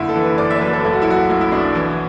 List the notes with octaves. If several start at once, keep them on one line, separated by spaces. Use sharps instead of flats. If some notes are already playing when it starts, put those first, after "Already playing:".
Already playing: F#1 D3 E4
A4
E3
B4
F#1 D5
E5
D5
F#2 B4
A4
B1 A4
F#4
E4
F#3 F#4
B1 E4
E4
B2 D4
E3